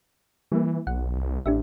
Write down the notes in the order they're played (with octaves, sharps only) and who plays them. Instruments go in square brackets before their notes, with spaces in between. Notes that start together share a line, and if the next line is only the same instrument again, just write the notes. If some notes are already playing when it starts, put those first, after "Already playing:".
[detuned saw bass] E3 [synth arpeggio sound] G3 A#3
[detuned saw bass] B1 [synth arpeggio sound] F#5
[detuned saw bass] C2
[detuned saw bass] A1 [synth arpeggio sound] D4 G4 E5